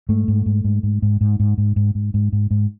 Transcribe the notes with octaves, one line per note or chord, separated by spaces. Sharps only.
G#2 A3
G#2
G#2
G#2
G#2
G#2
G#2
G#2
G#2
G#2
G#2
G#2
G#2
G#2